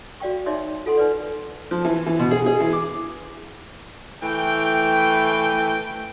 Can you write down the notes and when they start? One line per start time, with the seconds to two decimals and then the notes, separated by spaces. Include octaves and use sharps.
0.20 F#4 D5 F5 G5 C#6
0.46 D#4 C#5 D5 E5 C6 D6
0.86 F4 A4 F#5 C6
0.98 D#4 B4 D5
1.71 F3
1.85 E3
2.06 E3
2.19 B2
2.31 G#4
2.46 G#4
2.60 E3
2.73 D6
4.23 E3 A3 G5